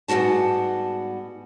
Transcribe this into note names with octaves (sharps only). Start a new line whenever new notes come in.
G#2 G3 B3 F#4 A5